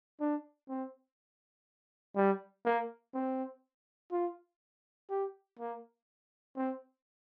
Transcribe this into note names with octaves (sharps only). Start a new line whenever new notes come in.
D4
C4
G3
A#3
C4
F4
G4
A#3
C4